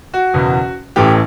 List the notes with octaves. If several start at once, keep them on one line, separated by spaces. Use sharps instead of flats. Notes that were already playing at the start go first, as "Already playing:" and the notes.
F#4
F#1 E2 B2
A1 A2 E3 G4